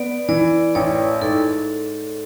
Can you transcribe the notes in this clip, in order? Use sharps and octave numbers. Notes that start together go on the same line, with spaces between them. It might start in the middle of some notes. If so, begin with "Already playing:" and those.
Already playing: B3 B4 D5
E3 D5
A1 C#5
G#2 A4